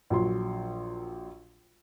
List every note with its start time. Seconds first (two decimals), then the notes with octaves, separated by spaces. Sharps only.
0.10 A#1 F#3 C6